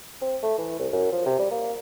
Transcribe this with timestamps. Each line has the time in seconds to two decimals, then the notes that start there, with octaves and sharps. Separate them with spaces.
0.22 C4
0.43 A3
0.58 E3
0.79 C2
0.93 F#2
1.12 F3
1.26 C3
1.39 G3
1.51 A#3